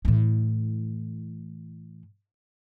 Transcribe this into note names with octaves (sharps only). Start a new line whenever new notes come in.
A2 E3